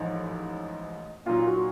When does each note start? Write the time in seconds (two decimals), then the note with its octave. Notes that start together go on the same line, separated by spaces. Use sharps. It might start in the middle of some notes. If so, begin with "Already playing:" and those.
Already playing: A1 G#2 F3 A3 D#4
1.26 A#2 F#3 A#3 D#4 F4
1.47 F#4